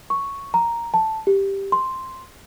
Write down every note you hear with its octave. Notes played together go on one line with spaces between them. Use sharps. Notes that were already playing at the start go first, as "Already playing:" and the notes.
C#6
A#5
A5
G4
C6